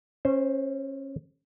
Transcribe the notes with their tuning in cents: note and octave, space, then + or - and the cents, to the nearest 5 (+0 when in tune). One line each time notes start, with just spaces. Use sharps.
C#4 -25 C5 +0